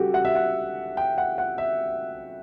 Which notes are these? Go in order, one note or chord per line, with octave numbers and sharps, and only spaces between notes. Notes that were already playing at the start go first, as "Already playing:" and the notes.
Already playing: C#3 G3 C#4 F#4 G4 A4
F#5
E5
F#5
G5
F#5
F#5
E5